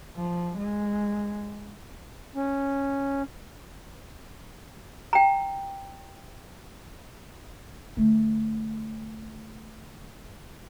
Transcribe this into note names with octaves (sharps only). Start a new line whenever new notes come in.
F3
G#3
C#4
G5 A#5
D3 A3